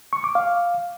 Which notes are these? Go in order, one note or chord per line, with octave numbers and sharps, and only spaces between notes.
C#6
D6
F5